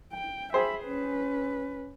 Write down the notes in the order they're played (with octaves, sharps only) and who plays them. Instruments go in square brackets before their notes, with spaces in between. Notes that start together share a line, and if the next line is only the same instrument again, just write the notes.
[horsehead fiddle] G5
[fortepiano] G#4 C5 G5 [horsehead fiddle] E5 B5
[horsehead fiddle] C#4 B4